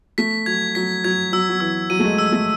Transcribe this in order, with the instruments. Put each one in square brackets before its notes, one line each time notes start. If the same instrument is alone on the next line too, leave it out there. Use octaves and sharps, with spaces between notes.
[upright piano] A3 [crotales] B6
[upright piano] F#3 [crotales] G#6
[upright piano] F#3 [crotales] B6
[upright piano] F#3 [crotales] G#6
[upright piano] F#3 [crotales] E6
[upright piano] F#3
[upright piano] E3 [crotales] E6
[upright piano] F#3 [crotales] D#7
[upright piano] A3
G#3
[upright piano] G#3 [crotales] E6
[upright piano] A3